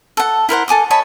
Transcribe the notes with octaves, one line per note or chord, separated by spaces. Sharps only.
A4 F#5
E4 A#4 C5 F#5
A4 G#5 D6 D#6
C#5 D#5 A5 B5